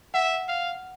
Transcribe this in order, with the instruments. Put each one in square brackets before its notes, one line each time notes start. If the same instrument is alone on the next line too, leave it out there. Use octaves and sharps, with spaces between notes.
[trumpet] E5 [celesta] F#5
[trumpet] F5